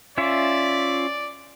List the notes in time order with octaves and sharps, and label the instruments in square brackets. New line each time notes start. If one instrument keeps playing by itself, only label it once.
[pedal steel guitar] C#4 F4 E5 [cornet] D5